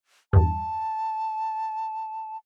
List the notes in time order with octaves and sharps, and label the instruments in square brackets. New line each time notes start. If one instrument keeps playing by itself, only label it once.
[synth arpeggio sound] E2 G2 [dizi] A5